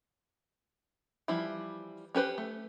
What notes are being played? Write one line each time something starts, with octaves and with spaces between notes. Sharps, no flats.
E3 F3 G3 E4
C#4 G4 B4 C5
A3